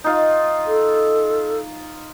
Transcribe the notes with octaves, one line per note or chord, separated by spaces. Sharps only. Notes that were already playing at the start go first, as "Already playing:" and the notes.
D#4 F4
A4